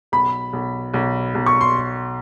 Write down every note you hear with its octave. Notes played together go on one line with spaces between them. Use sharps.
B1 B5
B1
B1
B1
C#6
C6